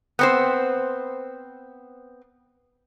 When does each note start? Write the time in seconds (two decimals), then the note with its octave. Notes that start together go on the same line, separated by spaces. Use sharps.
0.19 B3 C4 C5